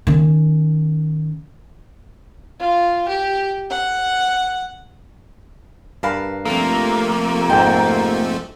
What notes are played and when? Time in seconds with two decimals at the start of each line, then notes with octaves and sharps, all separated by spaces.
0.07 D#3 C#4
2.60 F4
3.08 G4
3.70 F#5
6.03 G2 A#4 B4 F5 A5 B5
6.45 C3 F3 A3 A#3
7.50 F2 G#2 G5 A5